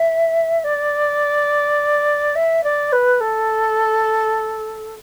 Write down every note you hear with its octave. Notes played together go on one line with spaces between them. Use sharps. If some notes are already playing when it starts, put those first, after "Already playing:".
Already playing: E5
D5
E5
D5
B4
A4